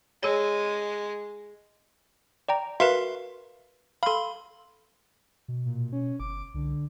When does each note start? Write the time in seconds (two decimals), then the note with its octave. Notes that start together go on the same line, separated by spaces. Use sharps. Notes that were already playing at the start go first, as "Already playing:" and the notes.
0.23 G#3 G#4 C#5
2.49 D5 G5 A#5
2.80 F#4 A#4 B4 E5 F5 C6
4.03 A4 F5 B5 C6
5.48 B2
5.65 A#2
5.93 C#4
6.20 G1 D6
6.54 C2 D3